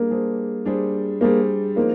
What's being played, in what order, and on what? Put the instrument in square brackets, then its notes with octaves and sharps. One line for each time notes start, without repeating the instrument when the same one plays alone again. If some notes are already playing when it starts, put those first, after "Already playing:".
Already playing: [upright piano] G3 D4 G#4 [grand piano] A#3
[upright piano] G3 D4 G#4 C5
G3 D4 G#4 C5
[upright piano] G3 D4 G#4 C5 [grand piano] A#3
[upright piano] F3 G#3 C4 D#4 [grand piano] A#3